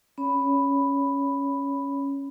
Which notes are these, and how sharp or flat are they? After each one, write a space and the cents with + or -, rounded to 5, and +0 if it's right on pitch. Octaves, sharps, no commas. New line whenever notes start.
C#4 +0 C#5 +25 B5 +0